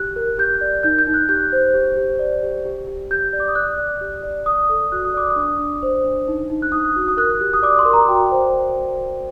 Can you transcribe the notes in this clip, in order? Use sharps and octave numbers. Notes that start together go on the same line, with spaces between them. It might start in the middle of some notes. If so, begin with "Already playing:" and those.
Already playing: G4 F#6
A#4
G4 G6
D5
D#4 G6
G6
D#4
F#6
G4 G6
C5
G4
G4
D5
G4
G4
G4
G4 G6
D5
D6
D#6
D5 F#6
D5
G4
D5
D5 D#6
A4
F#4 F#6
D#6
D5 D6
D#6
D4
D4
C5
D4
D#4
D#4
F#6
D#4 D#6
F#4
D#6
A#4 F#6
G4
D#6
D5 D6
C6
A#4
A#5
F#4 G5
C5